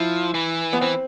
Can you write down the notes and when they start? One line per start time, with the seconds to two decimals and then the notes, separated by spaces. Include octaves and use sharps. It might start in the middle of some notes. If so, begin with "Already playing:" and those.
Already playing: F3 E4
0.34 E3
0.73 B3
0.81 E3 C4